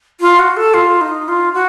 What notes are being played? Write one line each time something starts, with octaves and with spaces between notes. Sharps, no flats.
F4
F#4
A4
F4
D#4
F4
F#4